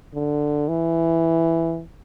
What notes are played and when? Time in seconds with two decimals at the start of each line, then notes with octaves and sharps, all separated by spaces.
0.14 D3
0.68 E3